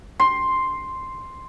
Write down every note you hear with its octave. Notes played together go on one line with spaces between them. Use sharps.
C6